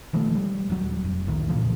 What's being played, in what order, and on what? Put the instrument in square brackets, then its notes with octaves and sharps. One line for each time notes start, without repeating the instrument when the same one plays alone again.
[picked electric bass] B2 D#3 F3 A3
G3
D#1 F#3
F1
E1 C2 A2 D#3
A#2 C#3 E3 F3